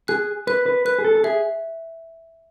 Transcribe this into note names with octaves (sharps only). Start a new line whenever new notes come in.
G#4 F#6
B4 F#6
B4
B4 F#6
G#4
A4
A4
G#4 E5